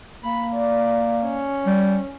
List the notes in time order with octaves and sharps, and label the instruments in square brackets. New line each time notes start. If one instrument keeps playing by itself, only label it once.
[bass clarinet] A#3 [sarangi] B5
[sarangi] D5
C#4
[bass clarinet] G3